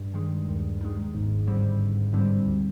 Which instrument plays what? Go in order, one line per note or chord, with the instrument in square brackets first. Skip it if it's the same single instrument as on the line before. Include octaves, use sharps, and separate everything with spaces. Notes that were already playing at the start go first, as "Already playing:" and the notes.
Already playing: [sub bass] G2
[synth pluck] D#3 G#3
D#2
D#3 G#3
[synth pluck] G1 [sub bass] G#2
[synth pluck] G2 D3 G3 C4
G1
G2 D3 G3 C4
D2